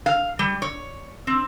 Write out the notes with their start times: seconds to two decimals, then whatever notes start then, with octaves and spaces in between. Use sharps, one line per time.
0.06 F5
0.39 G3
0.62 C#5
1.27 C4